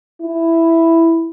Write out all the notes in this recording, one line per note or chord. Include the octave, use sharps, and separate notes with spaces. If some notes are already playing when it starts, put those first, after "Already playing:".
E4